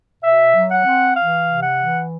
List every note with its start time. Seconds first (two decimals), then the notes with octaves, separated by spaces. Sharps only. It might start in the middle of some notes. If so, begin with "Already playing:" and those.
0.23 B2 E5
0.55 F#3
0.71 F#5
0.85 C4
1.16 E3 F5
1.47 C3
1.62 F#5
1.78 E3